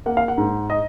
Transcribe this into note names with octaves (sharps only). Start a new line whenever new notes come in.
A#3 F#5
F5
F#5
G#2
D#5